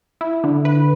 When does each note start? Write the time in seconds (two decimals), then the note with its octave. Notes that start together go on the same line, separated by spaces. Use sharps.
0.21 E4
0.44 D3
0.65 B4